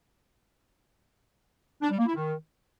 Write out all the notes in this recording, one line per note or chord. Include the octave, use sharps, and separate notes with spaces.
D4
G3
A#3
E4
D#3